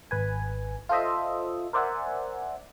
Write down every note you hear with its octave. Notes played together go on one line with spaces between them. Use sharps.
G#1 B4 G#5
F4 A4 C5 D#5 E5
A#4 C5 D5 E5 F#5 G#5